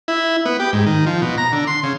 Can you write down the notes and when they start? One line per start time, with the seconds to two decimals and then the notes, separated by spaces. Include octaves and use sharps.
0.08 E4
0.46 B3
0.60 G4
0.73 G#2
0.86 D#3
1.06 F3
1.22 B2
1.38 A#5
1.52 D3
1.67 C6
1.83 C#3